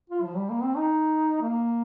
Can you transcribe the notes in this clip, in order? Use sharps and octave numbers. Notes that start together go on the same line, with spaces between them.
F4
F3
G3
A#3
C4
D#4
A#3